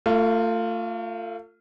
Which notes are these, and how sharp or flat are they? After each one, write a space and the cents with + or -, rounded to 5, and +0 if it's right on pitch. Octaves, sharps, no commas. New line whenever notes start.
A3 +35 F4 +0